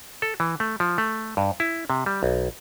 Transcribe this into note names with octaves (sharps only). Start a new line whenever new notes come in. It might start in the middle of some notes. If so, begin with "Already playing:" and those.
A4
E3
A3
F3
A3
G2
E4
C3
G3
B1